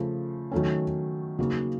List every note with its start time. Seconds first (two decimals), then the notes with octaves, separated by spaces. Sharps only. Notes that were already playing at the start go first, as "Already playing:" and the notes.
Already playing: C#3 F3 A3
0.51 D#3 F#3 A3 C#4
1.39 C#3 F#3 A#3 D#4